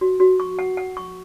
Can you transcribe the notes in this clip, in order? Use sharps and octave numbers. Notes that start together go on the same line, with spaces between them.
F#4
F#4
C#6
F#5
F#5
C#6